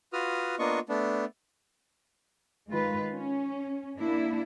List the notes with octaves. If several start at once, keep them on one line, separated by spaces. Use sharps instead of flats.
F4 F#4 B4 D#6 F6
A#3 B3 D4 F4 D#5 C#6
A3 B3 D4
D#3 G#3 F4 B4
C#4
A#3 D4 E4